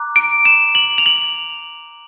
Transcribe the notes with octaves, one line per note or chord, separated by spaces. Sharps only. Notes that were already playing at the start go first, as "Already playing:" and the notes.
Already playing: A#5 D6 F#6
D7
E7
F#7
F7
F#7